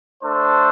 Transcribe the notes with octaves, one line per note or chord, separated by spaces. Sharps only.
A3 D4 A4 C5